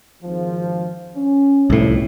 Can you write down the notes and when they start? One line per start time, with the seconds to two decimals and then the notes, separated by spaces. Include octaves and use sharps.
0.23 G#1 F3
1.16 C#4
1.70 G1 C2 F2 A2